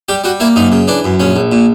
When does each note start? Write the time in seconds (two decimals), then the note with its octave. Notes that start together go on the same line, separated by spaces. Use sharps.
0.09 G3 G4
0.24 G3 F#4
0.40 A#3 E4
0.56 F#2 D#4
0.72 C#3
0.88 E3 D4
1.05 F#2
1.20 A#1 C#4
1.36 A#1
1.52 A#2